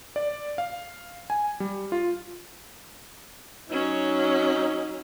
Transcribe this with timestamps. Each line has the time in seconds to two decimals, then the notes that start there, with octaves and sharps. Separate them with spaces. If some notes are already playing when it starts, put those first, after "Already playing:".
0.16 D5
0.58 F5
1.30 G#5
1.60 G3
1.92 F4
3.70 F#3 C#4 D#4